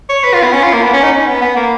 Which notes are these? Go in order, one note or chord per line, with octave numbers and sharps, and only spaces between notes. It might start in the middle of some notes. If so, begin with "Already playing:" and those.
C#5
B4
F4
B3
C#4
F4
A#3
B3
C#4
D#4
C#4
B3
B3
A#3